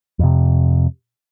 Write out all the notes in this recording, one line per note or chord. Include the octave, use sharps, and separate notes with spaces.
F2 C3